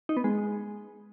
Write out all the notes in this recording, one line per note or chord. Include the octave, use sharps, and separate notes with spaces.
D#4
B3
G#3